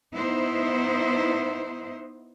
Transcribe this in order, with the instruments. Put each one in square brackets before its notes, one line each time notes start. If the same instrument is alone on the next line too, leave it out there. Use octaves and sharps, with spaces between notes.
[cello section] B3 D#4 E4 C5